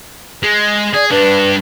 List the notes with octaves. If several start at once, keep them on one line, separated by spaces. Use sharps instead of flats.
G#3
G#4 D5
G2 D4 B4